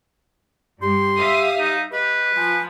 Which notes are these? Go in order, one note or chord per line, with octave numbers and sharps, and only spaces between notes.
G2 G4 C6
E5 F5 D#6
D#4
G4 B4 D#5
F3 G#5